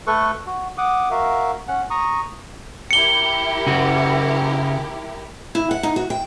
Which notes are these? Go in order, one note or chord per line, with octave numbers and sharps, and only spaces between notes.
A3 A4 B4 C#6
F#4
F#5 D6 D#6
F#4 A#4 E5 F5
C#4 F#5
A#5 C#6 D#6
E4 G4 A#4 C#7 G7
C#3 F#4
E4
F#5
D#4
F#4
G5